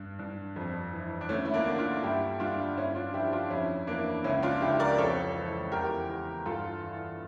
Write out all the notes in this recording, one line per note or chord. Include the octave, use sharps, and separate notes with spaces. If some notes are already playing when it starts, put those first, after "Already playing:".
Already playing: G2
G2
F2
E3
D4
D2 A3 C#4
E4
A#3 D4
D2
D4 F4
G2 E4 G4
G2 D4 F4
G2 C#4 E4
D4 F4
F3 E4 G4
D4 F4
F2 C#4 E4
E3 A#3 D4
C#2 C#4 E4
D4 F4
C#2 E4 G4
A#4 D5
F2 A4 C#5
E3
E2 G4 A#4
E2
G2 F4 A4
E3